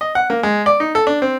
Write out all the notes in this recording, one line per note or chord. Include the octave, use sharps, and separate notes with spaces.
D#5
F#5
A#3
G#3
D5
D#4
A4
D4
C4